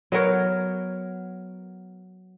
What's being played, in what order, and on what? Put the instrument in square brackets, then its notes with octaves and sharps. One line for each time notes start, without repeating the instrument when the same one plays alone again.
[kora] F#3 B3 A#4 C#5